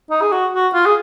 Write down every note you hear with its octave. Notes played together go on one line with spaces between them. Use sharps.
D#4
G#4
F#4
F#4
F4
G#4